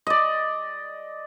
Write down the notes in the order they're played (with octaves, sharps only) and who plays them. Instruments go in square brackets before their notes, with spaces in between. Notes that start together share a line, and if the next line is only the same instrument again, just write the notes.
[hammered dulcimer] D5 D#5